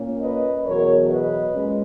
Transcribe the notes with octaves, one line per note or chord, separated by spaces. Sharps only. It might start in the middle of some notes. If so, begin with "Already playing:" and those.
Already playing: A#2 A#3 C#4
B4 D#5
E2 B2 F#3 A#4 C#5
B4 D#5
A#2 G#3 C#4